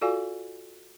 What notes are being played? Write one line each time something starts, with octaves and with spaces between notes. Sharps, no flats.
F4 F#4 A4 D5 F5 G#5